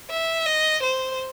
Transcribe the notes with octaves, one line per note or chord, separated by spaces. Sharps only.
E5
D#5
C5